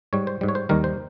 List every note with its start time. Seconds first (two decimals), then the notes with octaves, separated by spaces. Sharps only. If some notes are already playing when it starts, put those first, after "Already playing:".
0.13 G#2 G3 C#5
0.27 C5
0.41 G#2 G3
0.49 C#5
0.55 C5
0.69 D#2 D#3 G3 A#4
0.84 C5